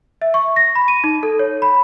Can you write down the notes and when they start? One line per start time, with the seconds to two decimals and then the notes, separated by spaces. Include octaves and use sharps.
0.22 E5
0.34 C#6
0.56 A#6
0.75 B5
0.88 D#7
1.04 D#4
1.23 A4
1.39 C#5
1.62 B5